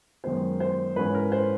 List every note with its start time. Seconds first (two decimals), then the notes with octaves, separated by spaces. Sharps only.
0.24 F#2 D#3 G#3 B3 C5
0.60 C5
0.96 G#2 E3 G#3 C#4 B4
1.14 A#4
1.32 C5